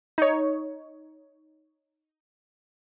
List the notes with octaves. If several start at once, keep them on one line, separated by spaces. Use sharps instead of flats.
D#4 C#5